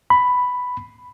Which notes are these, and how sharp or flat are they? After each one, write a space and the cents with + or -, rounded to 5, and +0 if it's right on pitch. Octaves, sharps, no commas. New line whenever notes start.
B5 +5